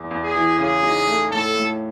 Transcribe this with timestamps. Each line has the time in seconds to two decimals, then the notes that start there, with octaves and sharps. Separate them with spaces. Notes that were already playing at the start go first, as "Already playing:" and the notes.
Already playing: E2
0.11 E2
0.23 G#4
0.35 E3
0.59 C#3 G#4
0.83 D#4
1.07 A3
1.31 A2 A4
1.56 A2